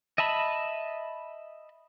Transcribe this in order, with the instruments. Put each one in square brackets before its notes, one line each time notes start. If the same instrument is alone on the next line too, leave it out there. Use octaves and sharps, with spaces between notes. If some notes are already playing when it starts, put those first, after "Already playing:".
[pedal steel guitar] D#5 E5 A5 B5